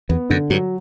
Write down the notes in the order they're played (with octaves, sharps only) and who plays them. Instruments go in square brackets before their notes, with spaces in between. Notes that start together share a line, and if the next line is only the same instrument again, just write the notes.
[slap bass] E2 [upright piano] B3
[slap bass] F#2 [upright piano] D3
[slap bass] G2 [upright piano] F#3